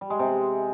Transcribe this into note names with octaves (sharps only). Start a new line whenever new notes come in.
G3
G#3
C3